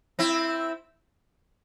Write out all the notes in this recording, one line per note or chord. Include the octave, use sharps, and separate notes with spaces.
C4 E4